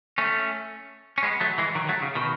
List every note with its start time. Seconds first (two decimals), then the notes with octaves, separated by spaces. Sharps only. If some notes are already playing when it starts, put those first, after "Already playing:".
0.18 A3 C#4
1.18 C#4
1.23 G#3 B3
1.41 F#3 A3
1.58 E3 G#3
1.75 D#3 F#3
1.89 F#3 A3
2.02 C#3
2.15 B2 D#3